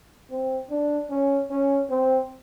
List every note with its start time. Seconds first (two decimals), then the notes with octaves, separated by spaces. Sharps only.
0.30 C4
0.70 D4
1.10 C#4
1.50 C#4
1.90 C4